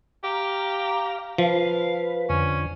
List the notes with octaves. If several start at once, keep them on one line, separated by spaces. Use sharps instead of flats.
G4 F5 A#5
F3 B4 F5
F2 D3 C#4